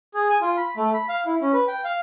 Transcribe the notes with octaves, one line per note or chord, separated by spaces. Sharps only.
G#4
G#5
F4
B5
A3
B5
F5
E4
C#4
B4
G5
F5